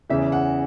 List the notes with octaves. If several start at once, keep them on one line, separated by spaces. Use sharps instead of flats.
E2 C#3 E3 E5
F#5